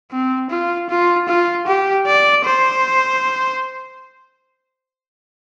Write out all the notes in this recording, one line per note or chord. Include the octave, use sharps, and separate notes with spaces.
C4
F4
F4
F4
G4
D5
C5